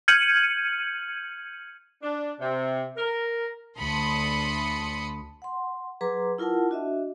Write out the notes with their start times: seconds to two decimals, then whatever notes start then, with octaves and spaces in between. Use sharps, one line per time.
0.08 F6 G6 G#6 C#7 D#7 F#7
2.02 D4
2.40 C3
2.96 A#4
3.77 D2 A5 B5 C6 D#6 C#7
5.42 F#5 C6
6.01 F#3 G#4 B4 A#5 C6 D6
6.38 E4 F4 A#4 F#5 A5
6.69 D4 F#4 D#5 E5